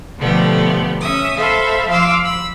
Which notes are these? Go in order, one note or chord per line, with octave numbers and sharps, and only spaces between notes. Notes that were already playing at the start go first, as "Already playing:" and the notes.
B2 D3 F3 A3 B3 G4
C#4 E5 D#6
A4 C5 E5 F5 A5 B5
F3 F5 C6 D6 E6
B5 E6